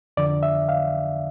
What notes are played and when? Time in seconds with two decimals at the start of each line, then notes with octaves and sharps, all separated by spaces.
0.17 F2 D3 F3 D5
0.43 E5
0.69 F5